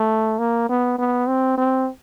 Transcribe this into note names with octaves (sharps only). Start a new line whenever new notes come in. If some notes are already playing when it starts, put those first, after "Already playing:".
Already playing: A3
A#3
B3
B3
C4
C4